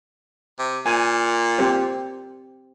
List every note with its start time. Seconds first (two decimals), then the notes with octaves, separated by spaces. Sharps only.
0.59 C3
0.86 A#2 G#5
1.59 C4 G4 C5